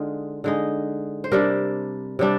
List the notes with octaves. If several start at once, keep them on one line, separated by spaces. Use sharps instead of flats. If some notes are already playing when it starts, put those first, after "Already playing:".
Already playing: D3 G#3 D#4 F4
D3 G#3 D#4
C5
C3 G3 D4 G4 A#4
C3 G3 D4